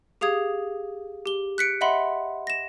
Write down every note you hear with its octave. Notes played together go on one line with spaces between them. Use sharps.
G4 G#4 F5 D#6 G#6
G4 G7
F#6 B6 C#7 D7
D#5 E5 F#5 B5 C6
A#6 E7